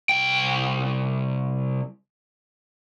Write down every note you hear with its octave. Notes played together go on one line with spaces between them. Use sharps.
C2 G5